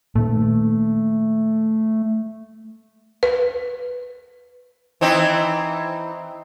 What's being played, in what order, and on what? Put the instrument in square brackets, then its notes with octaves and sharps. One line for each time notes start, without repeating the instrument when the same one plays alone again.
[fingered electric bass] A#2 D#3 [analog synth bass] A3
[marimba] B4
[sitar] E3 C4 D#4